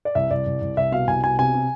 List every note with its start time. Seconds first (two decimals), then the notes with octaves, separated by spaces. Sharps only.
0.05 D5
0.15 C2 E5
0.30 C2 D5
0.47 C2
0.62 C2
0.77 C2 E5
0.92 B2 F5
1.08 C2 G#5
1.23 B2 G#5
1.39 C3 G#5
1.54 C3